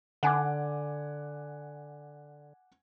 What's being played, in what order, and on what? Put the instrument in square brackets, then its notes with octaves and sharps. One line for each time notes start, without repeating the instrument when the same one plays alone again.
[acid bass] D3 [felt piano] F#5 G#5 D6